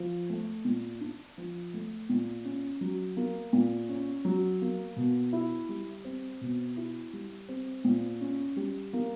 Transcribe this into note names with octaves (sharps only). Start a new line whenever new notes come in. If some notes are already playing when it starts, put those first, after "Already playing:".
Already playing: F3
A3
A#2
D4
F3
A3
A#2
C#4
F#3
A#3
A#2
C#4
F#3
A#3
B2
E4
G3
C4
B2
E4
G3
C4
A#2
C#4
G3
A#3